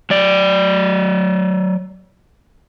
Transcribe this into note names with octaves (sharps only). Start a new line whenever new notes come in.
F#3 D5